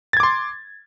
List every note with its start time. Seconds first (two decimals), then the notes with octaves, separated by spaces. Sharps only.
0.13 A6
0.17 G#6
0.20 D6
0.23 C6